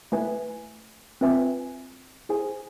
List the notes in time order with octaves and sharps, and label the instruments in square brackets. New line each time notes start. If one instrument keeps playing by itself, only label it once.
[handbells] A3 E4 B4 E5 G#5
C4 F4 B4 E5 G#5
E4 G#4 C5 G#5